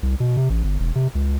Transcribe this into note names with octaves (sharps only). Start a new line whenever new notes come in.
C2
B2
C3
A1
G1
E1
C3
C#2